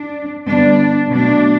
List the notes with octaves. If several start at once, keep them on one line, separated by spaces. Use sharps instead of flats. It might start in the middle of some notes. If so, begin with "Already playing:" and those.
Already playing: D4
D3 G3 B3 D4
B2 F#3 A3 D4